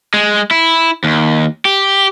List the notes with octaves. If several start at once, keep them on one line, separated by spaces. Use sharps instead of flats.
G#3
E4
D#2
G4